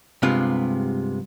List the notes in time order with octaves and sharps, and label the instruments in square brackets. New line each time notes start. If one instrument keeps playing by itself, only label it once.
[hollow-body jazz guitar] G2 C3 G#3 B3 F4